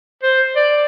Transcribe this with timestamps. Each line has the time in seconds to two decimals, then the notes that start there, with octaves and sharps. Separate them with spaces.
0.23 C5
0.56 D5